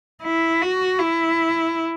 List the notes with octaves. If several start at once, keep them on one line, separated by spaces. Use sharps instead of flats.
E4
F#4
E4